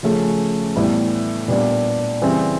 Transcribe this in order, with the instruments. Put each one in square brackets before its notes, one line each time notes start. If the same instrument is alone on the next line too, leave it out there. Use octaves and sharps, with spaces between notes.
[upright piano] C#3 F3 A3 C#4
A2 E3 G3 B3 E4
A#2 G3 B3 D4
C#3 E3 G3 C4